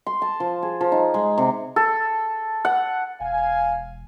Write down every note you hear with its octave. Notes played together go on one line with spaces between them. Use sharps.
C6
A5
F3
G#4
F3
D#4
G#3
C3
A4
F#5
E1 F5 G#5